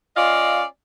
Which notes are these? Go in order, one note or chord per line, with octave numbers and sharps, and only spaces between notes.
C#4 F4 D5 D#5 F5